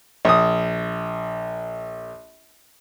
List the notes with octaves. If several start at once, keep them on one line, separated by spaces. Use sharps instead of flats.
A#1 D#6